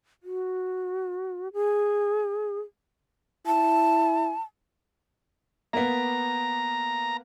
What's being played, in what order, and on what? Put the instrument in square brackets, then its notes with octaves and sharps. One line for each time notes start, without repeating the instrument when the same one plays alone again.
[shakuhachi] F#4
G#4
[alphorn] E4 [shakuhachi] A5
[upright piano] A#3 B3 [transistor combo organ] A#5